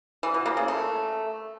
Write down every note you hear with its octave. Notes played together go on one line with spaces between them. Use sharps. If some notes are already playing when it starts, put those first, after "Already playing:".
E3
B2
A#3
C#3
A3